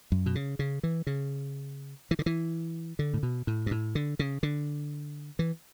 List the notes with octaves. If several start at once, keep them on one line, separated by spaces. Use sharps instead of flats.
F#2
B2
C#3
C#3
E3
C#3
E3
D3
E3
D3
A2
B2
A2
G2
A2
D3
C#3
D3
E3